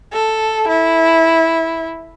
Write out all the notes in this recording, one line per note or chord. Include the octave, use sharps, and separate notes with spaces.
A4
E4